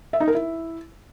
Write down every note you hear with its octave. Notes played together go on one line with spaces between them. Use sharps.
E5
D#4
A#4
E4